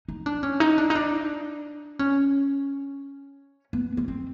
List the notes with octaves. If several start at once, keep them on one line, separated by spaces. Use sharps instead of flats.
D#4
D4
C#4
D#4
D4
D#4
D4
C#4
B3
B3
C4